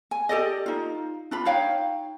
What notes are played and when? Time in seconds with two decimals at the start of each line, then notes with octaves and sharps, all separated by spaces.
0.11 G#5
0.29 G4 A4 D5 D#5
0.66 D#4 F4
1.31 D4 F4 B5
1.45 D#4 C#5 F5 G5